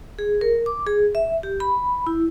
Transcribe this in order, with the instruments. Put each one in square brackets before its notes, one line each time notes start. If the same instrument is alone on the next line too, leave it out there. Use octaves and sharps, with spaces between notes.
[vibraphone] G#4
A#4
D6
G#4
E5
G4
B5
E4